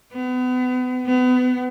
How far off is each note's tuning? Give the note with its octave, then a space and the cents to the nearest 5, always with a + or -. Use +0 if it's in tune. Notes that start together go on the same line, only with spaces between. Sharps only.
B3 +35
B3 +30